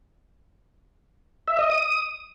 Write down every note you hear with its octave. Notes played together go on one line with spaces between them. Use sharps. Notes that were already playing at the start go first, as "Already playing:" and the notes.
E5
D#5
D#6